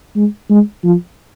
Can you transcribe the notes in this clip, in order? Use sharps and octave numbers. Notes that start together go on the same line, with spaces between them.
G#3
G#3
F3